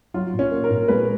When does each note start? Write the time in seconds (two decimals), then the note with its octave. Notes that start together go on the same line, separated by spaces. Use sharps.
0.14 F#3 F4
0.33 A#2
0.39 C#4
0.51 A#3
0.64 A#4
0.70 A#2
0.88 G#3 B4